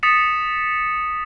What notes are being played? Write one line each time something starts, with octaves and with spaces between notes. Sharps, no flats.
D#6 A6 B6 C#7 E7